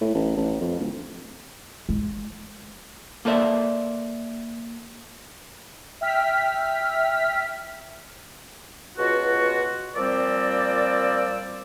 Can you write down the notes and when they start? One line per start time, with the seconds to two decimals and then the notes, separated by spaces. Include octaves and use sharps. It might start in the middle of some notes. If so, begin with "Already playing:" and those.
0.01 A2
0.15 A1
0.37 A1
0.60 F2
0.79 D1
1.89 G#3
3.25 A#3 A4 B4 C5 D5 E5
6.01 E5 G5 F6 B6
8.97 C#2 B2 F4 F#4
9.96 A#2 F3 G3 C4 D5 E6